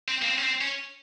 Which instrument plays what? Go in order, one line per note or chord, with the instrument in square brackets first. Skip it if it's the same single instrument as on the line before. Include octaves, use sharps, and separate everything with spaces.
[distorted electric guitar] C4
A#3
C4
C#4
C4
C#4